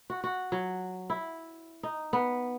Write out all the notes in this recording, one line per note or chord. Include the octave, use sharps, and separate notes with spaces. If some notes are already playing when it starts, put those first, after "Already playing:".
F#4
F#4
F#3
E4
D#4
B3